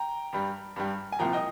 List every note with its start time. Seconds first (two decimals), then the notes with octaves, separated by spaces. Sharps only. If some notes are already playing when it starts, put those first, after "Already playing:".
Already playing: G5 A#5
0.33 G2 G3
0.76 G2 G3
1.12 G#5
1.19 C2 A#2 F3 G5 A#5
1.33 D#5 G5